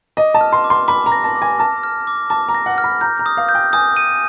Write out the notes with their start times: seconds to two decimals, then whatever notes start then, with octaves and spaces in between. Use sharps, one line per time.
0.17 D#5 D6
0.34 A5
0.41 F6
0.53 C6
0.64 D6
0.70 C6
0.88 B5 D6
1.06 A#5
1.12 A#6
1.24 A5
1.36 D6
1.42 G#5
1.59 A5 F6
1.84 F6
2.07 D6
2.30 A5 D6
2.49 A#5
2.54 A#6
2.66 F#5
2.78 F6
2.84 B5
3.01 A#5 G6
3.19 A#5
3.26 D#6
3.37 F5
3.49 G6
3.55 G5
3.73 G#5 D#6
3.97 D#7